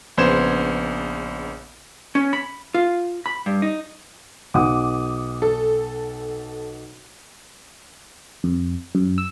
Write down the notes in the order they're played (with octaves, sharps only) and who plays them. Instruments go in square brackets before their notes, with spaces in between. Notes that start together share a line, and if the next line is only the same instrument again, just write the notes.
[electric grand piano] A#1 C#3 B3 C5 G#6 E7
[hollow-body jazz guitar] C#4
B5
F4
B5
G2
D#4
[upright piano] B1 F#5 D#6 [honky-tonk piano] D6
[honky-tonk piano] A4
[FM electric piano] F2
F#2
E6